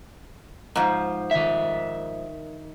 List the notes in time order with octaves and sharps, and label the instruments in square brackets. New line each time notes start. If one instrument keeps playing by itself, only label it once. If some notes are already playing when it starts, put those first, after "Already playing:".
[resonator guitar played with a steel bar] G#2 F3
[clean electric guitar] D#3 E5